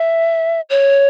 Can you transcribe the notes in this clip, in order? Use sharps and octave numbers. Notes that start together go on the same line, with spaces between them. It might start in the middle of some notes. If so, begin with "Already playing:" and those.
Already playing: E5
C#5